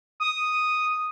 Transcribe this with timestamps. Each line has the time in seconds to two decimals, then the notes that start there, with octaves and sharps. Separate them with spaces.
0.20 D#6